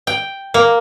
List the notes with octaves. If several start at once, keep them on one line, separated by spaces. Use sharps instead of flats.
G5
A#3